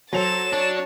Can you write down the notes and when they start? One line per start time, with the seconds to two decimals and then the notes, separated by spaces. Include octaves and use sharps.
0.13 F#3 A4 C5 A6 E7 F7
0.53 D4 C#5 A5